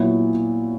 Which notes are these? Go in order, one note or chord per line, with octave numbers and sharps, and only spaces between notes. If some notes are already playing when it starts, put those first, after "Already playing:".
Already playing: A#2 F#3 B3 E4